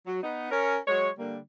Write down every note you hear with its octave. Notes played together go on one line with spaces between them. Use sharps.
F#3
B3 D#4
C#4 A#4
F#3 G#3 C#5
D3 G3 A#3